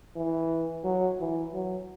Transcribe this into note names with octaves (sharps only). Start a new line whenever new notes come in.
E3
F#3
E3
F#3